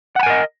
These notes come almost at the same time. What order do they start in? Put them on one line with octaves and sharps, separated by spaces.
F#5 B5 G#5 A#4 D#5